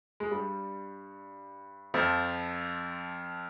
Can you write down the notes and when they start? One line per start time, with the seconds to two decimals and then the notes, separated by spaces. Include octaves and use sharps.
0.20 G#3
0.31 G2 G3
1.94 F2 F3